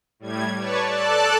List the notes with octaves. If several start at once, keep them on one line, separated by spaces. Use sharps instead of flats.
A2 G3 G#6
B4 C#5 D5 A5 C#6
A4 D5 A5 F#6